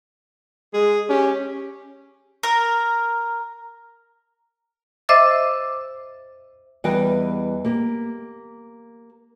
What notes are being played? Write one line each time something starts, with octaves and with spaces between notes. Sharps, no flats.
G#3 G#4
C#4 G4
A#4
C5 D#5 E5 D6 E6 A6
E2 E3 G3 B4 D#5 G5
A#3 G4